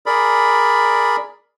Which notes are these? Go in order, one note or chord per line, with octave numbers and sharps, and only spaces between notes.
G#4 A#4 D5 B5